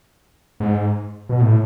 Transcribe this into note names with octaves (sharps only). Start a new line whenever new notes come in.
G#2
B2
A2